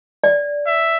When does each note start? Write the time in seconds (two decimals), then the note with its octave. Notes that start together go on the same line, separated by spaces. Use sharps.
0.24 D5
0.67 E5